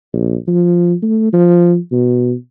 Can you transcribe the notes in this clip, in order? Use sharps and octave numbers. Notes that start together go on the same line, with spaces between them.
A#1
F3
A3
F3
B2